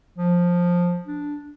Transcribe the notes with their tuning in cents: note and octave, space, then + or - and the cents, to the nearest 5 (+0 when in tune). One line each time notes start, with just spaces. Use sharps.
F3 +10
D4 -5